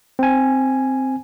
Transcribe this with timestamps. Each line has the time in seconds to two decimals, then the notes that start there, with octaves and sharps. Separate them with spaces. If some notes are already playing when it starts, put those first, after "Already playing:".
0.19 C4 G#5